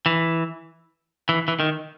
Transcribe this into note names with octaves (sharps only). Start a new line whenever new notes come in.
E3
E3
E3
D#3